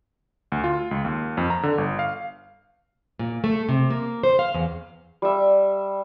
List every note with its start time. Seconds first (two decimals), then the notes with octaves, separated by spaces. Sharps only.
0.52 D2
0.64 F4
0.91 C#2
1.05 D#2
1.37 F2
1.50 A#5
1.63 D3
1.78 G1
1.99 F5
3.19 A#2
3.44 A3
3.69 C3
3.90 A#3
4.23 C5
4.39 F5
4.54 E2
5.22 G3 E5